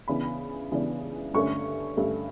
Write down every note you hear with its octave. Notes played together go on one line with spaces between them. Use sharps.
C#3 E3 B3 D4 B5
C#3 E3 B3 D4
G2 D3 A3 C#4 C#6
G2 D3 A3 C#4